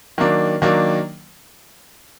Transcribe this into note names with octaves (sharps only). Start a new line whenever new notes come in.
D#3 F#3 A#3 D4
D#3 F#3 A#3 D4